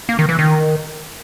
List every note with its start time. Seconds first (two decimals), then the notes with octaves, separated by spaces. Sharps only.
0.09 A#3
0.19 D#3
0.29 E3
0.39 D#3